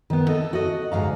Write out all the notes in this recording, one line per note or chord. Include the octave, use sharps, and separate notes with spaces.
D#3 B3
A4 D#5
F#4 D#5
D2 G#2 E3 F5 A#5